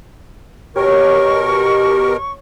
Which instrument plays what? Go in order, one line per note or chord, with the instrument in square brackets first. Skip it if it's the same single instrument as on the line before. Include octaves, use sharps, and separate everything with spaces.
[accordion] B2 A#4 [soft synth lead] G4 [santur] C#5 [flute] C#6